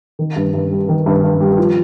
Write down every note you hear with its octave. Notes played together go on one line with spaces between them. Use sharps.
D#3
G2
G2
G3
D#3
G2
G2
G3
F3